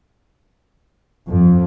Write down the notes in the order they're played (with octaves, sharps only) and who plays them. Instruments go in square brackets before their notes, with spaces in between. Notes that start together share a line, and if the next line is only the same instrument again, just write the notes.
[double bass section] F2